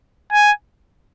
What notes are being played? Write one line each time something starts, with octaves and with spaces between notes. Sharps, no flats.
G#5